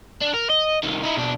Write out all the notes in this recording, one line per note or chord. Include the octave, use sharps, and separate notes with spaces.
D4
A#4
D#5
C2 D#3
D#4 E4
B1 D4